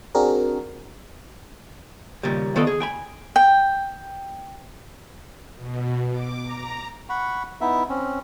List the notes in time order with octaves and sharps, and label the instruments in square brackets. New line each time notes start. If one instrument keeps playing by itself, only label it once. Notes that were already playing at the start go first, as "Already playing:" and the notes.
[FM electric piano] C4 D4 F#4 G#4 A#4
[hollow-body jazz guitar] D#2 A#2 C#3 G3
D#3 B3 F4 A4 D5 D#5
G#4
G5 G#5 B5
[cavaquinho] G5
[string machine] B2
D6
A#5
[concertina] F#5 B5 C#6
B3 D#4 E4 E5
C4 C#4